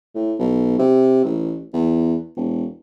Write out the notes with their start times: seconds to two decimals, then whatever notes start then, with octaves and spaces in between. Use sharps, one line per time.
0.15 A2
0.39 B1
0.79 C3
1.25 A1
1.74 E2
2.36 E1